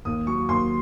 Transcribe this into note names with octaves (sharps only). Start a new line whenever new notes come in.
D#2 D#6
F#3 C#6
D#2 C6